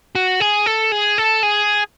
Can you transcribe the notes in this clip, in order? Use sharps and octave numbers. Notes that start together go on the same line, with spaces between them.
F#4
G#4
A4
G#4
A4
G#4